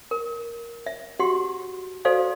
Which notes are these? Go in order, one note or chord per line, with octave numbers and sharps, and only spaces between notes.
A#4
E5
F#4 G4 F#5 C6
F#4 A4 C5 D5 F5